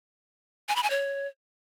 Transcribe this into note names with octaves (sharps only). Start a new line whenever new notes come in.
G#5
B5
G#5
C#5